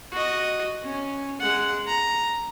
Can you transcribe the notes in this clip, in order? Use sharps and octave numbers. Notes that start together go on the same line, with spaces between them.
F#4 D#5
C#4
G#3 F#5
A#5